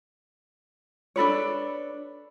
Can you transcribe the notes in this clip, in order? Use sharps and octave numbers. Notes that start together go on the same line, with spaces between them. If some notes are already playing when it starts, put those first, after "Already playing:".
D4 A4 B4 C#5